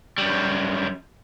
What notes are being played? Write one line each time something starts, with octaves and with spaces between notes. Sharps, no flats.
F#2 G3